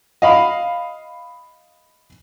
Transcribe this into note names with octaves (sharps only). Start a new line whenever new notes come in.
D#5 F5 B5